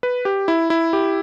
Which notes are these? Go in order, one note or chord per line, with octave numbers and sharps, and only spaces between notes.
B4
G4
E4
E4
G4